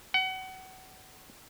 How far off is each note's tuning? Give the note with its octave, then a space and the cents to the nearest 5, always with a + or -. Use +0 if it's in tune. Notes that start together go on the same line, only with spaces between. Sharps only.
F#5 +30